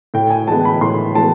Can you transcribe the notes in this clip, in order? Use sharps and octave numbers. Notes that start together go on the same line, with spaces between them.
A2 G5
G#5
E3 G#3 B3 A5
B5
A2 C6
E3 G#3 B3 A5